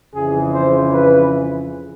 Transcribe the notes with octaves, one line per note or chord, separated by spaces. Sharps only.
F2 C#3 E3 G#4
C5
B4